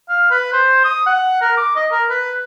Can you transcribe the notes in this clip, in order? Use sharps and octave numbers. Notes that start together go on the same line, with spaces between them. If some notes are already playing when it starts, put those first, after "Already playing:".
F5
B4
C5
D#6
F#5
A#4
D6
D#5
A#4
B4